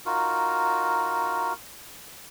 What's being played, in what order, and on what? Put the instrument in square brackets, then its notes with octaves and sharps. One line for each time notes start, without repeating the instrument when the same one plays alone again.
[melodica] D#4 F4 F#4 A#4